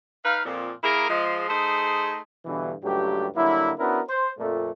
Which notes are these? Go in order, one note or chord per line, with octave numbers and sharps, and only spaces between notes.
D#4 B4 F5
F2 A#2
A#3 E4 G#4 A#4
F3 G#3
A3 D#4 G#4 C5
G2 B2 D3 E3
C#2 G2 F#3 A3 G4
D3 F#3 G3 A#3 E4
B3 C#4 D4 E4 F#4 A#4
C5
F2 A#2 A3